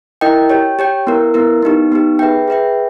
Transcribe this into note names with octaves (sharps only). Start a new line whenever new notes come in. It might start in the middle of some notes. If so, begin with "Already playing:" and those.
E4 A#4 D#5 G5
G4 C#5 G5
G4 C#5 G5
B3 E4 A#4
B3 E4 A#4
B3 D#4 G4
B3 D#4 G4
G#4 B4 E5 G5
G#4 B4 E5 G5